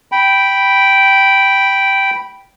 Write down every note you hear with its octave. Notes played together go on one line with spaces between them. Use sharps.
G5 B5